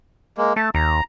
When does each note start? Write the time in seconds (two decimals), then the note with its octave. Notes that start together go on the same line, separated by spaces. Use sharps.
0.38 G#3 A#3
0.56 A3 A5
0.75 D#2 A#5